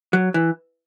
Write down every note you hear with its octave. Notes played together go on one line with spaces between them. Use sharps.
F#3
E3